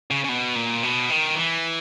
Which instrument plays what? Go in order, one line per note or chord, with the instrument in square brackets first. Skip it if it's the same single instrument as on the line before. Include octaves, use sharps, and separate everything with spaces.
[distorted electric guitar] C#3
C#3
B2
A#2
B2
D#3
E3